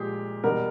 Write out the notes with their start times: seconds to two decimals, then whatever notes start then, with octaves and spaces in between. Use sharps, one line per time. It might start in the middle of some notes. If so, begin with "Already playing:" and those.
Already playing: A#2 F3 G#3 G4 G#4
0.43 E2 B2 G3 A#4